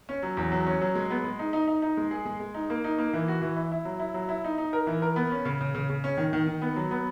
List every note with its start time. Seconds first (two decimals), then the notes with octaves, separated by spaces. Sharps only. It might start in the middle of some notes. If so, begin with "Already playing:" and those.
0.09 C#4
0.23 F#3
0.37 E2
0.52 F#3
0.66 C#4
0.81 F#3
0.95 G#3
1.10 B3
1.24 G#3
1.39 D#4
1.53 D#4
1.67 D#4
1.82 D#4
1.97 G#3
2.11 G#4
2.25 G#3
2.40 G#3
2.54 D#4
2.70 A#3
2.84 D#4
2.98 A#3
3.13 E3
3.28 F#4
3.42 E3
3.57 E4
3.72 E4
3.85 F#3
4.00 E4
4.14 F#3
4.29 E4
4.44 D#4
4.58 D#4
4.73 A#4
4.87 E3
5.02 A#4
5.16 B3
5.31 C#4
5.45 C#3
5.61 C#3
5.74 C#3
5.89 C#3
6.04 C#4
6.17 D#3
6.33 D#3
6.46 D#3
6.62 B3
6.76 F#3
6.91 B3